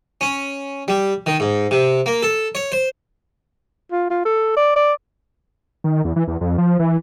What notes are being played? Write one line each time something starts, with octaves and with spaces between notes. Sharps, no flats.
C#4
G3
D#3
G#2
C3
A#3
A4
C#5
C5
F4
F4
A4
D5
D5
D#3
E2
E3
E2
F2
F3
E3